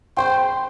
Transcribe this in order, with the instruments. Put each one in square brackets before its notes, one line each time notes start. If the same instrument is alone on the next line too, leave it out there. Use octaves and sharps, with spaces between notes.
[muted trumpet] C5 [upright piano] G5